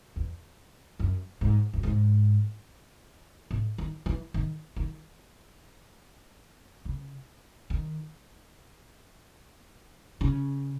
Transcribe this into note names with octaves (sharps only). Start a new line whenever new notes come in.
E2
F#2
G#2
F#2
G#2
A2
D#3
E3
D#3
D#3
C#3
D#3
C#3